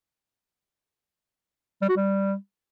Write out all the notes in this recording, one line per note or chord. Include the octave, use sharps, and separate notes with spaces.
G3
F#4
G3